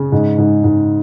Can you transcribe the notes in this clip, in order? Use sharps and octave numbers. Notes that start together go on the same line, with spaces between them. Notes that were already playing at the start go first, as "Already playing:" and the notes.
Already playing: C#3 G#4
G#2
G#2
G#2